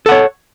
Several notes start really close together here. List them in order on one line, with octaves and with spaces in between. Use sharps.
A4 F#5 C#5